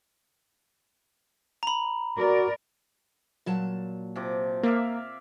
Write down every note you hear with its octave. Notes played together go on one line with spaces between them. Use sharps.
A#5 B5
F#4 A#4 D5
A#2 F#3 A5
C3 F3 D6
A#3 D5 E5 F5